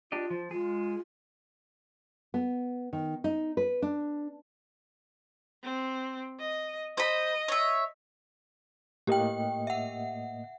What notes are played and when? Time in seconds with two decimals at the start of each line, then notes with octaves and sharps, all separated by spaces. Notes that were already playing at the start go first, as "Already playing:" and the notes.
0.12 D4 F4 G4 D#5
0.30 F3
0.51 G#3 F4 G#4
2.34 B3
2.93 D#3
3.24 D#4
3.57 B4
3.82 D4
5.63 C4
6.40 D#5
6.97 C5 D#5 B5
7.48 C#5 E5
9.07 A2 A#3 G4 D#5 G5
9.67 E5 F#5